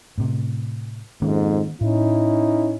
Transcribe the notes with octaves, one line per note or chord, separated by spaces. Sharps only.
A2 C3
F2 G#2 D#3 A#3 C#4
A2 C#4 D#4 E4